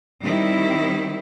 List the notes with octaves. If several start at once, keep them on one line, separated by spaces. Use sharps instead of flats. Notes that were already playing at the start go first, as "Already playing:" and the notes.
D#3 G3 C4 E4